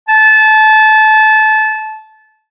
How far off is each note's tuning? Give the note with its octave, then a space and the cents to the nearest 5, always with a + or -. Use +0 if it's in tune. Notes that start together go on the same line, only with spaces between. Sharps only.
A5 -25